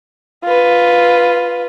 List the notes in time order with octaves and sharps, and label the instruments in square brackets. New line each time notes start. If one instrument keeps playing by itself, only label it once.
[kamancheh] F4 B4